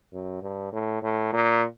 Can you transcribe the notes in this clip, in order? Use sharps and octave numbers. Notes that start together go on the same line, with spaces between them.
F#2
G2
A2
A2
A#2